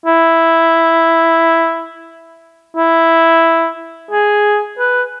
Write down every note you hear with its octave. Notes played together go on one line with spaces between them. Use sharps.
E4
E4
G#4
B4